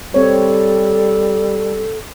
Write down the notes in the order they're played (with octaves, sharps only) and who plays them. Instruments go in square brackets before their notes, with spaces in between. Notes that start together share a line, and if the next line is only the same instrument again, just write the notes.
[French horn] G3 [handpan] C4 C#5 [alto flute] A4